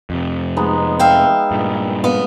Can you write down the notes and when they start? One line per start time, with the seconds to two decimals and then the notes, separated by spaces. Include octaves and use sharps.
0.10 F2 C3
0.57 G#3 B3 D#4
0.99 E5 F5 G5
1.51 G2 A#2
2.04 B3 F5